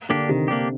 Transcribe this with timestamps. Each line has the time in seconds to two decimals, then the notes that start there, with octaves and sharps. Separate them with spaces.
0.09 D3 A#3 D4 G4
0.29 C3 D#3
0.48 A#3 D4 G4